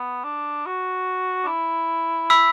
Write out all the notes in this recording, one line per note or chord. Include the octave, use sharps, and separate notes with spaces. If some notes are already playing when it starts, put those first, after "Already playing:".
Already playing: B3
D4
F#4
D4
E4
B5 E6 B6